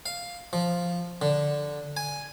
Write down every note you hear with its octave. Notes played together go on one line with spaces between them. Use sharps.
F5
F3
D3
G#5